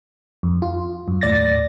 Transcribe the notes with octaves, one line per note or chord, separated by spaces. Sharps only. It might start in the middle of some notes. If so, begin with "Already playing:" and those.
F2
F4
F#2
D#2 A2 D5 A6 A#6